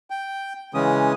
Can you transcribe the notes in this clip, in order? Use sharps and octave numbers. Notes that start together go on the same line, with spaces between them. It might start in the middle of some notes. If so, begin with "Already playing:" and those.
G5
C#3 E3 G#3 C#4 D#6